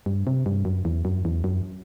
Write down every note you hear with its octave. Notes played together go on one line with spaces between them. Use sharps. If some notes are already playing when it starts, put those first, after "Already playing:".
G2
C3
G2
F#2
E2
F#2
E2
F#2